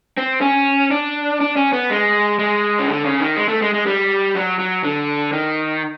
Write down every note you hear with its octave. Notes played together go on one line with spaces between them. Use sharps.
C4
C#4
D4
D4
C#4
B3
G#3
G#3
C#3
D3
C#3
D#3
G#3
A3
G#3
G#3
G3
F#3
F#3
D3
D#3